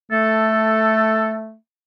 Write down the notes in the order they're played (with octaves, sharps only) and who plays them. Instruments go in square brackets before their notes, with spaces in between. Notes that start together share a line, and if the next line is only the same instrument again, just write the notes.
[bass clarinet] A3 [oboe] A4